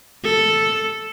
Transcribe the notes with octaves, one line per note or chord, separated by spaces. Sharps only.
A4